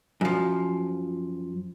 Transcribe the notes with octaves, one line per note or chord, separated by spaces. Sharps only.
F#2 F3